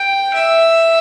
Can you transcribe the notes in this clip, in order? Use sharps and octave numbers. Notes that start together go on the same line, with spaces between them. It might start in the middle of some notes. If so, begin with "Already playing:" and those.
Already playing: G5
E5